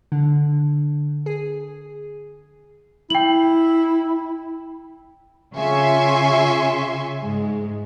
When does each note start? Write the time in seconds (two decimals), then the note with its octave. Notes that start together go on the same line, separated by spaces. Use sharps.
0.12 D3
1.26 G#4
3.10 E4 G5 F#7
5.57 C#3 F4 E5 G#5 C6 C#6
7.22 G#2 G#3